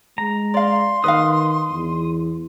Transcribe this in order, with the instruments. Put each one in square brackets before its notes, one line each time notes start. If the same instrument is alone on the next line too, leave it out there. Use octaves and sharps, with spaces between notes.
[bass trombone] G#3 [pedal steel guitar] A#5
[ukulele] D5 F5 [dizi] C6
[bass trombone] D#3 [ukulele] B4 D#5 F5 [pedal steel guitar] D#6
[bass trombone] E2